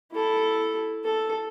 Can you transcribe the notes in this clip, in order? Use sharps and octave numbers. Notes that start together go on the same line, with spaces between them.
E4 A4
A4